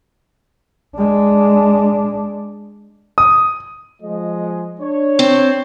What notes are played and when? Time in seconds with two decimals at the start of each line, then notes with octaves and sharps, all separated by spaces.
0.97 G#3 D4
3.18 D#6
4.02 F3 G#3 D#5
4.81 D4 C#5
5.19 C4